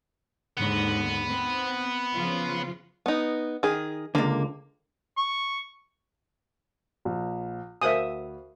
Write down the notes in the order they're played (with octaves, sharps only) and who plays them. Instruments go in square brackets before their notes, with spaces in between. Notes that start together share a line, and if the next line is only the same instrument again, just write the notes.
[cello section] D#2 G#2 D3 [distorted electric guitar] B3
[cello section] C4
C#3 F3 F4
[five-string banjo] B3 D#4
D#3 G#4
[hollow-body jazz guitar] C#2 D3 [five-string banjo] A#3
[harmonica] C#6
[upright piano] A#1
[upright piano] D2 F5 [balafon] A#4 C5 G#5 [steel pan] E5 D#6